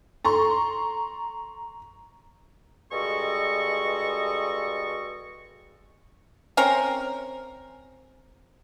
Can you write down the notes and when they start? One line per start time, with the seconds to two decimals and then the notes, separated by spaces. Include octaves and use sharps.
0.25 A4 A#5 C6 C#6
2.91 G2 G#3 F#4 A4 D#5 C#6
6.57 C4 C#4 A#4